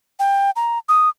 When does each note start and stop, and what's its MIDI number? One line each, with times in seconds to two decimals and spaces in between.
0.20 0.51 79
0.56 0.79 82
0.89 1.09 87